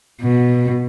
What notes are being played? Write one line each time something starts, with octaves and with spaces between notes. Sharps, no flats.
B2